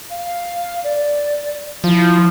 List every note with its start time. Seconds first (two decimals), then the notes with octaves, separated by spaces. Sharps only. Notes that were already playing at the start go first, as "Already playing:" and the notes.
0.10 F5
0.83 D5
1.84 F3 E4